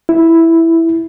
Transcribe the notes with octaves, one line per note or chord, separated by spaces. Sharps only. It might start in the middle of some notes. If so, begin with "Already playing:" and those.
E4